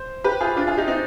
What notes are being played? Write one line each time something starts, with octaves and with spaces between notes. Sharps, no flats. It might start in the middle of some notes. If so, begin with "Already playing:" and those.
Already playing: C5
G4 B4
F4 G#4
D4 F4
F4 G#4
D#4 G4
C4 D#4